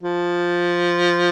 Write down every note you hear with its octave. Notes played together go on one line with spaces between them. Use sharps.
F3